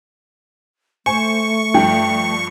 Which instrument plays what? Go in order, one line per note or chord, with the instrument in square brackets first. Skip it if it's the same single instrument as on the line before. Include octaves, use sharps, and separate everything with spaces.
[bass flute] A3 [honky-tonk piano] C5 [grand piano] G#5 [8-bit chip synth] C#6
[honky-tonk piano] G2 F3 [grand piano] G5